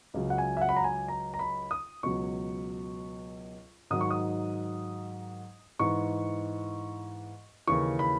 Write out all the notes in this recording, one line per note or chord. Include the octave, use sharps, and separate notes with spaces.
C#2 C#3 F#3
F#5
G#5
E5
F#5
B5
A#5
G#5
A#5
A#5
B5
D#6
C#2 B2 F#3 C#6
G#2 D#3 F#3 D#6
C#6
D#6
G#2 E3 C#6
D#2 C#3 E3 C#6
B5